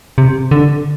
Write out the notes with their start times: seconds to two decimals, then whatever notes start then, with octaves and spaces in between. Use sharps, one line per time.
0.18 C3
0.51 D3